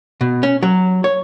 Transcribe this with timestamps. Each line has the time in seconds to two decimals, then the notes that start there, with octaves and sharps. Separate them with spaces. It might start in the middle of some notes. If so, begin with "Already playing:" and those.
0.21 B2
0.43 C#4
0.63 F#3
1.04 C#5